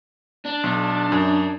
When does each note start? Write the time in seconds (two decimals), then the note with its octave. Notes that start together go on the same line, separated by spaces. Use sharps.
0.45 D4
0.64 B1
1.12 F#2